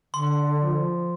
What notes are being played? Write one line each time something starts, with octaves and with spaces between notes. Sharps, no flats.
D3 C6
F3